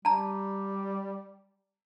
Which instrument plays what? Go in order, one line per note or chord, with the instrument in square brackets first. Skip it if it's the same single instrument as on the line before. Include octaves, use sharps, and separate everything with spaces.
[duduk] G3 [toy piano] A5 A#5